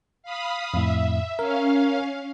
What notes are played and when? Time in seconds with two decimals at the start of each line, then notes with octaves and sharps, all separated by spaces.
0.23 F5 B5 D#6
0.74 F2 A2 E5
1.39 C#4 A#4 F5